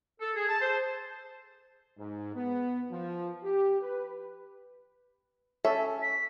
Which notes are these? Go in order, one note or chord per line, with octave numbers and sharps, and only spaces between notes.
A4
G#4
A5
C5
G#2
B3
F3
G4
B4
C#4 A4 E5
B6